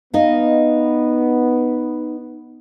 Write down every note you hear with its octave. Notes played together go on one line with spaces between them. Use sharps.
B3 D#4 D#5 F5